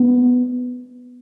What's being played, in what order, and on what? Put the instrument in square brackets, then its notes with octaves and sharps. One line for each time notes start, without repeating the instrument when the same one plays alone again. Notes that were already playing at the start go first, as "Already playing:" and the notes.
Already playing: [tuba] B3